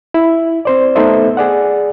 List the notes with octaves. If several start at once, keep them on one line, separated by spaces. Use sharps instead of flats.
E4
C4 C5 D5
A3 B3 D#4 A4 C5 E5
G#4 D5 F#5